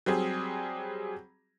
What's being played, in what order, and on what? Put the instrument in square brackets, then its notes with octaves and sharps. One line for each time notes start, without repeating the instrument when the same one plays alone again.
[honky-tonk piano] F#3 G3 C4 G#4